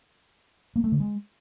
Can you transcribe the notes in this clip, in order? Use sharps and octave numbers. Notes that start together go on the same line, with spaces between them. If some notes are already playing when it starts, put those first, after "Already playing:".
A#3
A3
D3
G#3